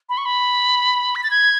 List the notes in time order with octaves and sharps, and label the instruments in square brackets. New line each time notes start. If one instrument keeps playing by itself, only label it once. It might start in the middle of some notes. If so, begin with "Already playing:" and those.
[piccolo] B5
C#6
B5
B6
A6
G#6